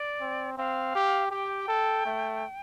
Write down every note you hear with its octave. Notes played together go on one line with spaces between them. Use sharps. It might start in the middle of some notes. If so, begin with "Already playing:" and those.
Already playing: D5
C4
C4 F5
G4
G4 G5
A4
A3